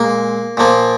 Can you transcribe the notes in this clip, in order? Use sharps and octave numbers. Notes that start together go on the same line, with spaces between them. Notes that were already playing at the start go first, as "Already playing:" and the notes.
Already playing: A#2 G#3 A#3
A#2 F3 A#3